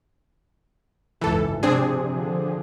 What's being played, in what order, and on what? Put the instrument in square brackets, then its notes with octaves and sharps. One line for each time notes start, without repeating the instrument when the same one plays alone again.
[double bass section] G#1 C#2 F#2 [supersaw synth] E3 A4
[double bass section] C3 F3 [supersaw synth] C4 D4 G#4
[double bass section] D3 F3